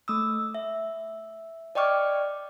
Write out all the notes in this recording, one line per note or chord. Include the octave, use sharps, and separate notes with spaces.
A3 D#6 E6
E5
D5 D#5 G5 C#6 D6 F6